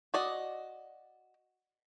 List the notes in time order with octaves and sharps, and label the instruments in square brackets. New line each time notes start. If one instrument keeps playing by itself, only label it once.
[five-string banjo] F#4 D5 D#5